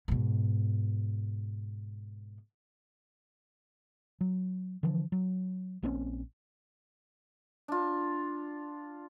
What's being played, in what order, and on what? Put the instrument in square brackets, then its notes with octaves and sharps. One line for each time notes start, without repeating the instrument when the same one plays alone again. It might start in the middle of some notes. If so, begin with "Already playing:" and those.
[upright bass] G#2 B2
[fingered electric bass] F#3
D3 E3 F3
F#3
A#1 A#3 C4 C#4
[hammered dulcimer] D4 F4